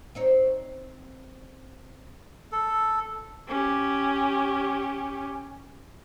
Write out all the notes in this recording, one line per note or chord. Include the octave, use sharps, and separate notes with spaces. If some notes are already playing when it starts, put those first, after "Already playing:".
C4 D#4 C#5
A4
C#4 G4